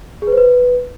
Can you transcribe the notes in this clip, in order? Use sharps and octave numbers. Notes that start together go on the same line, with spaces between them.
G#4
B4
C5
B4